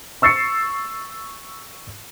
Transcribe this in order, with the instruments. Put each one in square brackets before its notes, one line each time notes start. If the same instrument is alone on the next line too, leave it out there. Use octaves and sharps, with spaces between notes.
[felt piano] C#6 E6 A6 C7 C#7